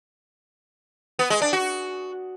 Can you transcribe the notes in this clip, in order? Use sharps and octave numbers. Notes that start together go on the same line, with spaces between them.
B3
G#3
D4
F#4